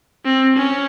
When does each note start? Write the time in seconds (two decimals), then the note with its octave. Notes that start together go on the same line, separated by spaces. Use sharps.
0.25 C4
0.56 C#4